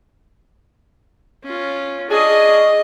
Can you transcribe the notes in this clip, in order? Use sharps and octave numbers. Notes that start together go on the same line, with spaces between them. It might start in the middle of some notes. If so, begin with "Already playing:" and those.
C#4 F4
C#4 D4 G#4 D#5